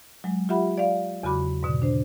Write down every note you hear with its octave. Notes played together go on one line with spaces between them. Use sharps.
F#3 G#3
F4 G4 E5 F#5 B5
D5 F5
E2 C#3 F#3 F#4 B5 D6
G#2 B2 D3
D4 C5